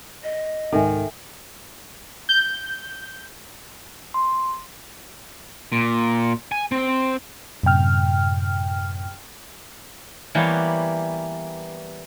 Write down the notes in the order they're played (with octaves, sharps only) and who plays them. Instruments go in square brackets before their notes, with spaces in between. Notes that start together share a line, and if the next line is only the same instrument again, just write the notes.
[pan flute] D#5
[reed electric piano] C2 G#2 [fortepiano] D#3 [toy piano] A4 E5 G#5
[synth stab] G6
[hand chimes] C6
[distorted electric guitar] A#2
G#5
C4
[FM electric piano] F#2 A2 C3 G5 F6
[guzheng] E3 G3 A#3 B3 G4 C#5